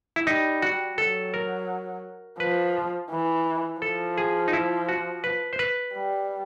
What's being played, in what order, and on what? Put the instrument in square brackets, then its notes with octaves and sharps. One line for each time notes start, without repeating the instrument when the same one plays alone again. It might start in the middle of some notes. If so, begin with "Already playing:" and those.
[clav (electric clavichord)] E4
[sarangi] G3 [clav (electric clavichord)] D#4
[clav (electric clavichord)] F#4
[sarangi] F#3 [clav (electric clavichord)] A4
[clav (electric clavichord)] A#4
[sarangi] F3 [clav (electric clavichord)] B4
[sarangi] E3
[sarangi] F3 [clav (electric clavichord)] A4
[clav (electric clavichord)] G#4
D#4
E4
F#4
B4
C5
B4
[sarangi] G3